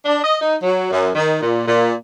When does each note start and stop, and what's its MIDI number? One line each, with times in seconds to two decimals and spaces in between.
0.05 0.22 62
0.24 0.37 75
0.41 0.55 63
0.63 0.90 54
0.91 1.10 42
1.15 1.41 51
1.42 1.64 46
1.67 1.93 46